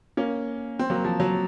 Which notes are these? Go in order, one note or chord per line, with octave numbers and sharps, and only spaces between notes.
A#3 C#4
C4
F#3 A#3
F3
F#3